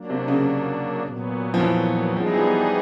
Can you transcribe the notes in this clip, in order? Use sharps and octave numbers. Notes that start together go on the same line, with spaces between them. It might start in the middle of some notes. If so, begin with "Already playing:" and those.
Already playing: F#3 A#3 D4
C3
C#3
A#2 F#3 B3
F3
E3
E3 F3 G3 B3 D#4 G#4
F#3
F3